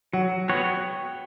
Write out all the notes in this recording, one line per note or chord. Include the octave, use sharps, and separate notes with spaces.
F#3 F#5
B3 F#4 C#5 G5